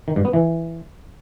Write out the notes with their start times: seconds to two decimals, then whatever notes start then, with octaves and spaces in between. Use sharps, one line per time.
0.08 D#3
0.16 G2
0.25 B3
0.33 E3